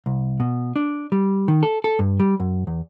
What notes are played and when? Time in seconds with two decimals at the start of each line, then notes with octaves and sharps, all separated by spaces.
0.06 C2
0.40 B2
0.76 D4
1.12 G3
1.48 D#3
1.63 A4
1.84 A4
1.99 G2
2.20 G3
2.40 F#2
2.67 E2